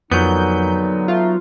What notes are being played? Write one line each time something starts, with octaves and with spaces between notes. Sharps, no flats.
F2 A#2 D3 F#3 B3 D#4 G6
A3 D#4 F4